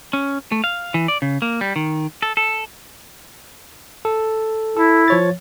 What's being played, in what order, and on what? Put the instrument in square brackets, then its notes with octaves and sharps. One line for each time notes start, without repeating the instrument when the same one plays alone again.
[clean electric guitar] C#4
A3
F5
E3
D5
C#3
A#3
G3
D#3
A4
A4
[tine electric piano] A4
[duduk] E4 [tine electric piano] A4
[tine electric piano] F3 C#5 A6